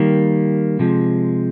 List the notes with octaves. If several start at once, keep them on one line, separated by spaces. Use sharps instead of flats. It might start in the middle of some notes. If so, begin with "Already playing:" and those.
Already playing: D#3 G3 A#3
C3 F3 G#3